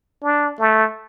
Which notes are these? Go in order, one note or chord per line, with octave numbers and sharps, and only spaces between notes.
D4
A3